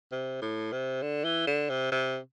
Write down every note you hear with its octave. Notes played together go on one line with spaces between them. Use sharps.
C3
A2
C3
D3
E3
D3
C3
C3